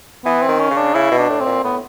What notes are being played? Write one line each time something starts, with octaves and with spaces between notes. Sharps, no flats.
E3 B3
C4
D#3
C#4
C#3
D4
C#3 E4
B2
D4
A2
C4
A#2
A2 B3